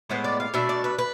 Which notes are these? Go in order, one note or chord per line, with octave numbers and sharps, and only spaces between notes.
A2 G#3 B3 C5
D5
F5
B2 A3 D4 E5
D5
B4
B4